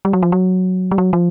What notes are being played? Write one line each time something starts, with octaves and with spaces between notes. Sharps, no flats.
G3
F#3
F3
F#3
G3
F#3
F3